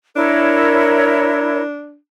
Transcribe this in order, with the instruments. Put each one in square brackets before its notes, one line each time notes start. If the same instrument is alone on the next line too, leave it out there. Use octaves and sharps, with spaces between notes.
[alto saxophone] D4 [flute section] E4 A#4 C#5